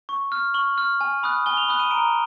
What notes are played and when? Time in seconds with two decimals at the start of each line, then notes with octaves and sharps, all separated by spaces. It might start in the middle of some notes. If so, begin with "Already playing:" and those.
0.09 C#6
0.32 F6
0.54 C#6 F#7
0.78 F6
1.01 G#5
1.23 B5 D#6 F#6
1.46 G#5 G7
1.57 F7
1.68 B5 D#6 F#6 F7
1.80 D#7
1.91 A#5 D7